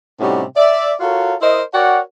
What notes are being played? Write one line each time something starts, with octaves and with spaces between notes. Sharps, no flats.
A2 C3 G3 C#4 D#4 F#4
D5 E5
F4 F#4 A4 A#4 C#5 F5
E4 A#4 C5 D#5
F#4 A#4 C#5 D5 F#5 G5